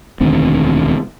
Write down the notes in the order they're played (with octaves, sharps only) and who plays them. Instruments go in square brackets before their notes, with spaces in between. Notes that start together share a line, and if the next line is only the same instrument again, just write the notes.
[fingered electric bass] E1 D2 D#3 C4